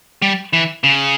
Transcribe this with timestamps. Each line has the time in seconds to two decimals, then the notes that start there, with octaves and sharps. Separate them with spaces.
0.22 G3
0.53 E3
0.84 C#3